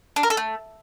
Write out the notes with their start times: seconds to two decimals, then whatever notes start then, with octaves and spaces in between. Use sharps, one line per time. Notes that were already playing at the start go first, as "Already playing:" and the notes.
0.16 D4
0.23 A#4
0.30 A4
0.37 A3